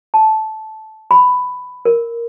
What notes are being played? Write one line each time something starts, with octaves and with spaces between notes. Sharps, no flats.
A5
B5
A#4